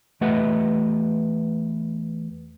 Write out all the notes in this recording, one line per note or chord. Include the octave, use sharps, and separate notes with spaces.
E2 A3 G4 B4 D#5 F#5